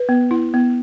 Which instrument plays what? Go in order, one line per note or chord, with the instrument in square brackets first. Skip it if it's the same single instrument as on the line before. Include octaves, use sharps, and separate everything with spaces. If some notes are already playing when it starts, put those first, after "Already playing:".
Already playing: [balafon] B4
B3
E4
B3